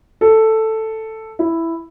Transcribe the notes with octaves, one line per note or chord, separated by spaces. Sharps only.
A4
E4